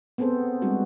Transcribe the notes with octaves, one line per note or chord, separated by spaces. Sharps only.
B3 C4 G#4 A4 C5
G3 G#3 C4 D4 F#4